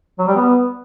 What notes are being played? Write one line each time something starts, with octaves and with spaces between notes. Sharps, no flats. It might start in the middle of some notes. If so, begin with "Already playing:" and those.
F#3
G3
B3